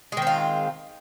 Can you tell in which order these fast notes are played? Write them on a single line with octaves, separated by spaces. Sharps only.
G#3 D#3 C4 F4